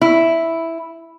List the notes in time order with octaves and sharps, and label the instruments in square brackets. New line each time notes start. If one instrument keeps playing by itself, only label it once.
[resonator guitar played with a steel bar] E4